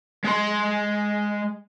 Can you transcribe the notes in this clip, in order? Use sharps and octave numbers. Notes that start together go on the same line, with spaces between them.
G#3 C6